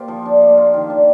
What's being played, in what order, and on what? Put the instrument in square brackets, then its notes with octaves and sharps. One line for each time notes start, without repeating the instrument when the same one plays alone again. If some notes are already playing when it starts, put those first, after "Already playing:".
Already playing: [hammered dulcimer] A#3 F4 G4 C5
F3
D4
A#3
F4
D#3
D4